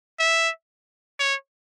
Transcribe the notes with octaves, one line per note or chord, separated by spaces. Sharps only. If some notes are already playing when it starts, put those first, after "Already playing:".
E5
C#5